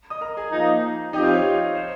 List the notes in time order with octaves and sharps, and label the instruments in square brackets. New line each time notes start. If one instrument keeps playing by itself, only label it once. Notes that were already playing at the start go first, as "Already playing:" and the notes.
[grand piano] D#5 D#6
A#4 A#5
G#4 G#5
[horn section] F3 A#3 D#4
[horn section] F3 C4 G4 [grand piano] D#4 D#5
[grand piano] F4 F5
C#5
C5